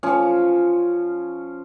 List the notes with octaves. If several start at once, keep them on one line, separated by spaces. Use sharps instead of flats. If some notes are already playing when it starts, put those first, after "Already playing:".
F3 C#4